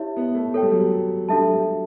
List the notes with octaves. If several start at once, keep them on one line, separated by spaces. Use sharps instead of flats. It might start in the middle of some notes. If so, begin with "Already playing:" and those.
Already playing: E4 G4 C#5 E5
B3
A3
A3 A4 C#5 G5
G3
F#3
G3
G3 D4 F#4 A4 E5 A5
F#3
G3